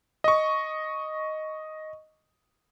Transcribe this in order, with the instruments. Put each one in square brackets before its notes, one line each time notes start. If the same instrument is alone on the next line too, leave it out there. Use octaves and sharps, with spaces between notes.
[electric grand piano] D#5 C#6